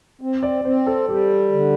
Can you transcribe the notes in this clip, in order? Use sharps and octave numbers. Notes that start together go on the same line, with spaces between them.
C4
D5
C4 C5
A4
G3 G4
D3